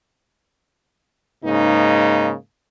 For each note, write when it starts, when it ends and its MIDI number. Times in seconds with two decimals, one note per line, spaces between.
1.44 2.33 44
1.44 2.33 49
1.44 2.33 58
1.44 2.33 63